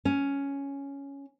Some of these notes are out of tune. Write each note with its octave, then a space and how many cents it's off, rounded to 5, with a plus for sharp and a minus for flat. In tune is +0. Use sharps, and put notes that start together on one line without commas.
C#4 +5